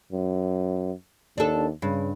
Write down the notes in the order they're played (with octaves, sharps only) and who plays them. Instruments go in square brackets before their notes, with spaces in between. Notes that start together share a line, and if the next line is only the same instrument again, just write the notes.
[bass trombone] F#2
[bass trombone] D#2 [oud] D4 A4
[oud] G2 [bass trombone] C#3